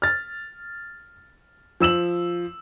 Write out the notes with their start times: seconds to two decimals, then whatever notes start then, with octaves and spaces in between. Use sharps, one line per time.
0.02 F6 A6
1.80 F3 E6 E7 F#7